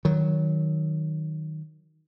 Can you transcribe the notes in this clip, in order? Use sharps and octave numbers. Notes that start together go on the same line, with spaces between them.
D#3 F#3